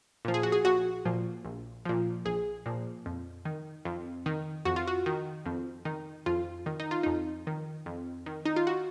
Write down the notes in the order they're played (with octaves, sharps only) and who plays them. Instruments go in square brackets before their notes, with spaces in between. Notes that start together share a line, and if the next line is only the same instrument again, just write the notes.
[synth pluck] A#2 F3
G#4
F#4
G#4
A#1 F#4
A#2 F3
A#1
A#2 F3
A#1 G#4
A#2 F3
F2
D#3
F2
D#3
F2 F#4
F4
F#4
D#3
F2
D#3
F2 F4
D#3
D#4
F4
F2 D#4
D#3
F2
D#3
D#4
F4
F#4